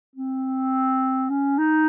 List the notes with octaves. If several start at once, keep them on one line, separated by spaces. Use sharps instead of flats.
C4
C#4
D#4